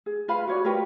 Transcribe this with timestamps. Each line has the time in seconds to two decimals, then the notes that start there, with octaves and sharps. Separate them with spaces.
0.06 G#4
0.28 F4 B4 F5 B5
0.48 F#4 C#5 D5
0.65 F4 G4 A#4 B4